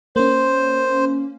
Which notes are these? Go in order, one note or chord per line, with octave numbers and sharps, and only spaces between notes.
A#3 C#4 C5